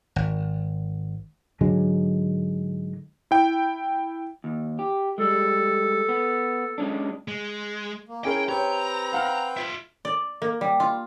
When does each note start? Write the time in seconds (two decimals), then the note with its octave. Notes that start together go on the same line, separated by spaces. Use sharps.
0.16 G#1
1.61 G#2 D3 F#3 G#3
3.31 E4 G5
4.44 D#2
4.79 G4
5.18 G3 G#3 A4
6.09 B3
6.78 G#3 C#4 D4
7.28 G#3
8.09 A#3
8.25 C#4 E4 G#4 A#4 C#5 G5
8.49 C4 G4 B4 C#5 G5 A#5
9.13 F5 F#5 F6
9.57 F4 E5
10.05 D5
10.42 A#3
10.61 G3
10.80 F4